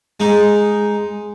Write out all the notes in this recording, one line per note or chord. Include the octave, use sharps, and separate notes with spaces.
G#3 D#4